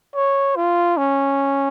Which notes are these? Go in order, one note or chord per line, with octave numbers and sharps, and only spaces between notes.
C#5
F4
C#4